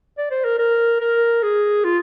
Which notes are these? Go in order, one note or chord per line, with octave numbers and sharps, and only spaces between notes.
D5
C5
A#4
A#4
A#4
G#4
F4